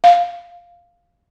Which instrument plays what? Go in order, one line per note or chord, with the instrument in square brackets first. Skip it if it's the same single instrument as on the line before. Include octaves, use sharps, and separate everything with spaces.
[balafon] F5